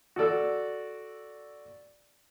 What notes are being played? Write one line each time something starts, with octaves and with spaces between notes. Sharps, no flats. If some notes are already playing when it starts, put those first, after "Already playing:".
F#4 A4 D5 E6